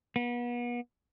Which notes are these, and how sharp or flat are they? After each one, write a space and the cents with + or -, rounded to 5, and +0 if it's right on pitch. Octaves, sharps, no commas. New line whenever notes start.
B3 -35